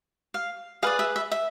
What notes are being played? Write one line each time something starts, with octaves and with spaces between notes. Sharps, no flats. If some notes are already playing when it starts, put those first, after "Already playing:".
F5
G#4 B4 D5 F5
E5
E5
E5